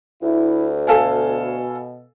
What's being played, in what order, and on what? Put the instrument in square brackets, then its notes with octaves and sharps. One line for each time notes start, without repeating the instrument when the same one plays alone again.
[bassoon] D2 [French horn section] E4
[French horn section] B2 [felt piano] A4 F5 G#5